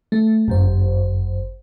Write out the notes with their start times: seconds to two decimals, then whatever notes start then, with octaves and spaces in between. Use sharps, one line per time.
0.12 A3
0.48 G1 F#2 C5